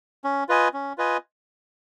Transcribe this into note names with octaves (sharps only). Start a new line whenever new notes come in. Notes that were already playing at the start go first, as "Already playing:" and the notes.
C#4
F4 B4 D#5 G#5
C#4
F4 B4 D#5 G#5